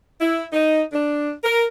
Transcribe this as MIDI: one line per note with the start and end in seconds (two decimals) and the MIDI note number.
0.21 0.43 64
0.53 0.81 63
0.92 1.31 62
1.44 1.64 70